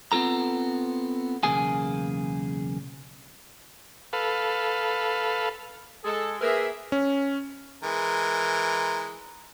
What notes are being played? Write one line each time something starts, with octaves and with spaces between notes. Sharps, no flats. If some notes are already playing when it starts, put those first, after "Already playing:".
B3 C4 F4 A4 A#5
B1 E2 C#3 A#3 G#4 G#5
A4 B4 F5
G#3 G#4 A4
A#3 G#4 A#4 B4 E5
C#4
E3 G#3 A#4